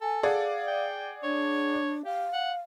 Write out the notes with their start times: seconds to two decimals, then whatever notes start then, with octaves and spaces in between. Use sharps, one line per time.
0.01 A4 G#5
0.23 G#4 D5 F5 F#5
0.67 G5
1.23 D4 C#5
2.05 G4 F5
2.33 F#5